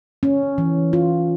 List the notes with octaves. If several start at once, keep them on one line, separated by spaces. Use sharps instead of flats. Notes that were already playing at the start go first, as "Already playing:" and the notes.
C#4
E3
F4